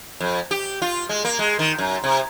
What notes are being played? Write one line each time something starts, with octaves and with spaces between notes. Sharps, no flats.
F2
G4
F4
G#3
A#3
G#3
D#3
F#2
C3